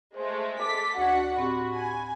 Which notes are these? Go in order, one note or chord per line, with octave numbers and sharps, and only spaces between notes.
G#3 A3 C5
A4 D6 B6
D2 D4 F#4 D#5 F#5 G#6
A2 C4 F#4 G4 B5
G#5